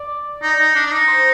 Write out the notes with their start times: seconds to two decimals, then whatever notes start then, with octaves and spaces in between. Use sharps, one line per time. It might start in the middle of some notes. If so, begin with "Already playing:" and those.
Already playing: D5
0.43 D#4
0.59 D#4
0.75 D4
0.86 D4
0.91 D#4
1.08 C5